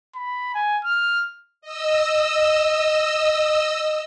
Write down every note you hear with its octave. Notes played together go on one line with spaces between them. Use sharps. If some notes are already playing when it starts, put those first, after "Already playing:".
B5
G#5
F6
D#5 E6